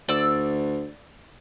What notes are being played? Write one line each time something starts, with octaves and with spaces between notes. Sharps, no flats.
D2 D5 E6